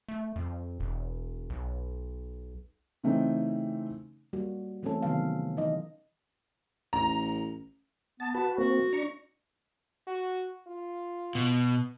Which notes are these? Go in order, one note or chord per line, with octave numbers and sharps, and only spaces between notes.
A3
F2
E1
B1
C#3 E3 A3 C4 C#4 D#4
G3 A#3 F#4
E3 A3 C4 C#4 A4
C3 D#3 F#3 B3 F5
E3 D#4 D#5
A1 A#5
B3 A5
F#4 B4 A5
A#3 C4 F#4
D4 A#5 C#6
F#4
F4
B2